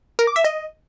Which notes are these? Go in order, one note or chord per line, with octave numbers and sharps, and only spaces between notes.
A#4
D6
E5
D#5